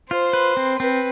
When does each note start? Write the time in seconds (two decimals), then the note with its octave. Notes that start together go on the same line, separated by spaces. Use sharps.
0.11 F4 C5
0.33 B4
0.57 C4
0.80 C4 B4